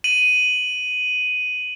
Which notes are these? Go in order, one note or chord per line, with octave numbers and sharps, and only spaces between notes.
D#7 F#7